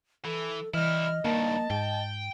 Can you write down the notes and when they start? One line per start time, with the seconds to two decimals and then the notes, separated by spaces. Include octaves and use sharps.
0.25 E3 A4
0.74 E3 G3 E4 D#5 F6
1.25 G2 D#3 A#3 A5
1.70 G#2 G5